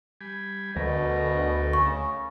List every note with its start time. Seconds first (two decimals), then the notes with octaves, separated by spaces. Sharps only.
0.21 G3 G#5 B5
0.76 D2 B2 A3 A#4
1.73 C#3 C#6